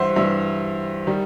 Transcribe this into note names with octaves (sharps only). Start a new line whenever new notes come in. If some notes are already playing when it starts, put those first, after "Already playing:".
Already playing: G2 E3 G3 C5 E5 F#5
G2 E3 G3 E5
D#3 G3